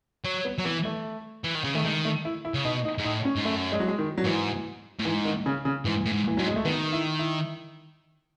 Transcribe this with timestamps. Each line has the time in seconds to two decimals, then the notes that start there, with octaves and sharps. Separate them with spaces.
0.24 F#3
0.45 B3
0.58 F#3
0.65 E3 B3
0.85 A3
1.44 E3
1.55 D#3
1.64 C#3
1.74 D#3 A3
1.84 D#3 G#3
2.05 A3
2.25 E4
2.45 E4
2.54 C#3
2.65 B2 D#4
2.85 D#4
2.98 G#2
3.05 A2 D#4
3.25 C#4
3.36 G#2
3.45 F#2 A3
3.72 G#3
3.80 F#3
3.88 G#3
3.98 D#3
4.18 F#3
4.25 G#2 E3
4.99 A2
5.05 G#2 E3
5.25 D#3
5.46 C#3
5.65 C#3
5.85 G#2 E3
6.06 A2
6.13 G#2
6.28 E3
6.37 G#2 F#3
6.47 G#3
6.56 A3
6.65 D#3 B3
6.93 E4
7.19 E4